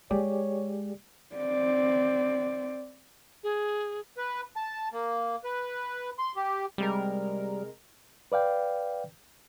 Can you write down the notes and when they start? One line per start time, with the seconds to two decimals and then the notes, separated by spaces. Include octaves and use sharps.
0.11 G#3 G4 G#4 C#5 D5
1.35 C4 D5
3.44 G#4
4.17 B4
4.56 A5
4.93 A#3
5.44 B4
6.19 C6
6.36 G4
6.78 C3 G3 G#3 A#4
8.32 B4 D5 F5 G5